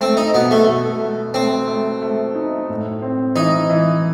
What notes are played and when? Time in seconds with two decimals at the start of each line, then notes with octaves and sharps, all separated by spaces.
0.01 A3 C4
0.17 D#4
0.34 B2 B3
0.51 A3
0.68 B2
1.01 A3
1.34 A3 C4
1.68 A3
2.02 A3
2.35 D#4
2.69 A2
3.02 C4
3.35 E3 D#4
3.69 E3